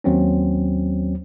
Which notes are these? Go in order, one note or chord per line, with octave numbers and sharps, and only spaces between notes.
D#2 F#3 C4 C#4